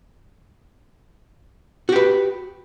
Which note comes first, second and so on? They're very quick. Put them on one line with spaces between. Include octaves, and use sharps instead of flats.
F#4 G4 B4